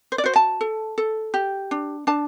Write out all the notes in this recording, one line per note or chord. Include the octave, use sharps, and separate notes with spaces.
C5
D5
F#4 C5
A5
A4
A4
G4
D4
D4 A5